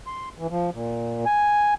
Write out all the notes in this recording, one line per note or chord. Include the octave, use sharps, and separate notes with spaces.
C6
E3
F3
A#2
G#5